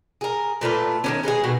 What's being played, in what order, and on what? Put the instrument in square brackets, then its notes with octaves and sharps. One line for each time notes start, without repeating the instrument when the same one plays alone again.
[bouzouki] G#4 A#4
A#2 A3 F4 B4
D#3 B3 C#4
G#3 B3 C#4 G#4
B2 D#3 F#4